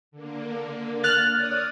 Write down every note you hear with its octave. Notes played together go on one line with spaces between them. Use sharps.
D3 A#3
F6 F#6 A6
C#5 D5 D#6